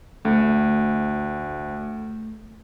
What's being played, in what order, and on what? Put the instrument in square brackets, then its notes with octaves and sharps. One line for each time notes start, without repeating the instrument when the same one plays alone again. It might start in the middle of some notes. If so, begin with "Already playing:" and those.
[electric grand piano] D2 [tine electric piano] A3